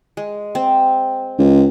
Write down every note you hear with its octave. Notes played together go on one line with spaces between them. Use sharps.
G#3
C4
C#2